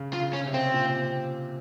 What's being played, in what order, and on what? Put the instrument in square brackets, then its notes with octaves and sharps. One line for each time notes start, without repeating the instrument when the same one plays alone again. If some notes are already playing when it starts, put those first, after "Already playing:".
Already playing: [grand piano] C#3
[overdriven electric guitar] F4
[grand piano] C#3
[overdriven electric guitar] C#4
[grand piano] C#3
C3
[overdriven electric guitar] C4
[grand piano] A#2